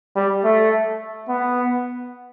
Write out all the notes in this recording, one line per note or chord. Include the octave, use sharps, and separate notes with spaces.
G3
A3
B3